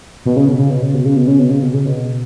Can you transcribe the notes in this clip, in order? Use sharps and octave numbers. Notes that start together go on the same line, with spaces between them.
B2
C#3
B2
C#3
B2
C#3
B2
C#3
B2
C#3
B2
C#3
B2
C#3
B2